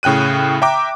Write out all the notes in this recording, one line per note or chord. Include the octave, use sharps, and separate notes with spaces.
A2 C#3 G5 F#6 D#7
E5 G5 A#5 D6